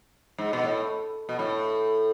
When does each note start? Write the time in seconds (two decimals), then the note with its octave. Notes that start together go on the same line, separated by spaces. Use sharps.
0.38 G#2
0.53 B2
0.63 A2
1.29 B2
1.39 A2